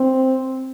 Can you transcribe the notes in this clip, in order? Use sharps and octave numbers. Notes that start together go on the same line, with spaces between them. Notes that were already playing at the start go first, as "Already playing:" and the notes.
Already playing: C4